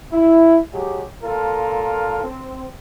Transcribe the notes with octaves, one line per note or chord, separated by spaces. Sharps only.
E4
F#3 G#3 G4
A#2 F4 A4 A#4
C4